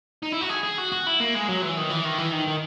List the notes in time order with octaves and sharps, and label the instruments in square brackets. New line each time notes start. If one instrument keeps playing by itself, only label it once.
[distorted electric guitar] D#4
E4
F#4
G#4
G#4
F#4
F#4
E4
A#3
G#3
F#3
E3
D#3
E3
D#3
E3
D#3
D#3